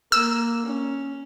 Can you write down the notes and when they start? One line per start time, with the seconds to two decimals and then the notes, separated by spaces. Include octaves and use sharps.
0.12 A#3 E6
0.66 C#4